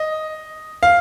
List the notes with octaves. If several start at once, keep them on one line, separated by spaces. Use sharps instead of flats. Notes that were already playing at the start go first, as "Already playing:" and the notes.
Already playing: D#5
F5